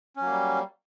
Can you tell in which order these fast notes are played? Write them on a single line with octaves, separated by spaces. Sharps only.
C#4 F#3 A#3 G3